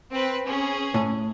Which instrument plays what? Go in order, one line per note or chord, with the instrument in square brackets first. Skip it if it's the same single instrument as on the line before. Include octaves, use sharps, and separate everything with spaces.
[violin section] C4 B4
C#4 G#4
[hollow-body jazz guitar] A2